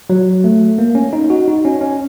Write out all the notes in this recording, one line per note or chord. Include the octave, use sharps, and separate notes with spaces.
F#3
A3
A#3
C#4
D#4
F#4
D#4
C#4
C#4